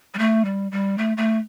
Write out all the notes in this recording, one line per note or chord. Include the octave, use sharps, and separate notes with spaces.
G3
A3
G3
G3
A3
A3